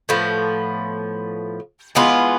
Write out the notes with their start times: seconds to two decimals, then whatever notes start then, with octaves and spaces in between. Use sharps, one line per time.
0.09 A2 F3 B3
1.95 E3 G#3 B3 F4